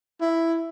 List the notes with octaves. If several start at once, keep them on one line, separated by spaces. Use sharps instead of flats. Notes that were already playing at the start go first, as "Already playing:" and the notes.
E4